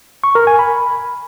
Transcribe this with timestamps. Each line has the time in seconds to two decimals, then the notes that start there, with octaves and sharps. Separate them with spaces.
0.24 C#6
0.35 A#4
0.47 G#5
0.59 B5